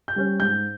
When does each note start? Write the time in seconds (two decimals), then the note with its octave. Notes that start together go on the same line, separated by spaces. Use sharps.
0.08 G6
0.16 G3 C#4
0.40 G#2 G6